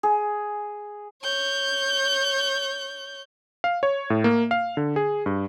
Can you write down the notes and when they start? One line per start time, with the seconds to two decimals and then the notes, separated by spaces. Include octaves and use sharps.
0.03 G#4
1.22 C#5 G6
3.64 F5
3.83 C#5
4.10 A2
4.24 A#3
4.51 F5
4.77 D3
4.96 G#4
5.26 G2